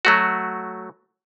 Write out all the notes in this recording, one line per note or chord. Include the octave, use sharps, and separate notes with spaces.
F#3 A3 F#4